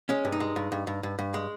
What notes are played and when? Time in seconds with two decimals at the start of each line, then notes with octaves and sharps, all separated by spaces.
0.09 G#3 C#4
0.25 G2
0.32 D#4
0.40 G#3
0.56 G2
0.72 G2
0.87 G2
1.03 G2
1.19 G2
1.34 G#3